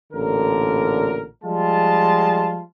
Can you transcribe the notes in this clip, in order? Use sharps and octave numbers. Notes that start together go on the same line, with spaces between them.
A1 A#2 D3 A#4
F3 G3 G#3 F4 A5